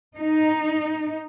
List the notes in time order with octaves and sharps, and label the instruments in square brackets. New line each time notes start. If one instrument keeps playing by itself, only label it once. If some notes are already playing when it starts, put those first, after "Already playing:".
[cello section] D#4